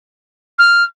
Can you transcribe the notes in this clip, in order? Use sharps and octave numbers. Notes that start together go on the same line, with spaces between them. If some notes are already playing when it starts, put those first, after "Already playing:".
F6